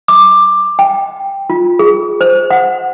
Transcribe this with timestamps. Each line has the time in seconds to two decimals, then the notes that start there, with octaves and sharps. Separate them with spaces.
0.08 D6
0.79 G5
1.50 F4
1.79 G#4
2.21 C5
2.51 F#5